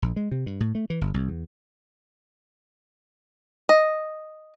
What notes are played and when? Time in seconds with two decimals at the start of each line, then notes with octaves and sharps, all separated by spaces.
0.02 A#1
0.16 G#3
0.31 C3
0.46 G2
0.60 A2
0.75 A3
0.90 E3
1.01 G1
1.14 C2
1.29 E2
3.69 D#5